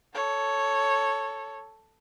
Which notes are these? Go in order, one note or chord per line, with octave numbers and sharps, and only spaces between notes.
A4 C#5